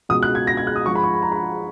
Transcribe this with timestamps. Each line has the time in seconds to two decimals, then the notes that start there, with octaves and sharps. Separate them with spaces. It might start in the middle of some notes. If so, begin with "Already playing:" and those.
0.09 C#2 B2 D#6
0.23 F#6
0.35 G#6
0.47 A#6
0.57 G#6
0.67 F#6
0.76 D#6
0.86 G#2 F3 C#6
0.95 B5
1.04 C#6
1.14 B5
1.22 A#5
1.32 B5